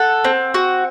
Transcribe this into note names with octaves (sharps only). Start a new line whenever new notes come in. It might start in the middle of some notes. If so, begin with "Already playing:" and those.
Already playing: A4 F#5
C4
F#4